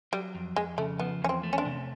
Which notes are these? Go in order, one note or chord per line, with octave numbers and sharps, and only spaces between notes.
F#3 G3
F2
F2 G#3
C#3 A3
F3 B3
E2 C#4
C4
A3
C#4
C4 D4
C3